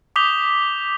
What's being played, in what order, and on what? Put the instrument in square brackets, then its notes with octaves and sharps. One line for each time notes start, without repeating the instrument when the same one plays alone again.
[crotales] D6 D#6 G6 B6 F7 G7